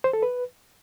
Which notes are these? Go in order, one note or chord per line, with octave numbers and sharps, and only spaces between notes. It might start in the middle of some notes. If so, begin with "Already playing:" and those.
C5
A4
B4